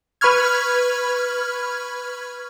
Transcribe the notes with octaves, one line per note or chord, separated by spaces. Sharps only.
B4 B5 C#6 F6 G#6